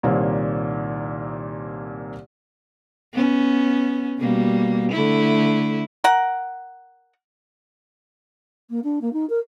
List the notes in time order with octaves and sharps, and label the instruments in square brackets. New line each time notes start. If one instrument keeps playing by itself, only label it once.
[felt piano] C2 A#2 D#3 A#3 C5 C#5
[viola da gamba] B3 C#4
B2 G3 A#3
D3 A3 E4
[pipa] A#4 F#5
[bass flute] A#3
D4
A#3
D#4
A#4